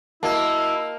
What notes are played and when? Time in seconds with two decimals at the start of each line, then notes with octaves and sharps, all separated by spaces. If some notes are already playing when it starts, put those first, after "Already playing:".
0.23 A#3 E4 F#4 D#5 A5